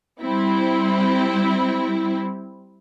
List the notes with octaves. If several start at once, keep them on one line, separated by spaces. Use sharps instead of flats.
G3 C4 E4